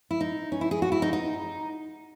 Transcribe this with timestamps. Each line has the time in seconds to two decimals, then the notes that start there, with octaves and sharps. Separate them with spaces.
0.11 E4
0.21 D#4
0.52 C#4
0.61 E4
0.71 G#4
0.82 F#4
0.92 E4
1.02 D#4
1.13 D#4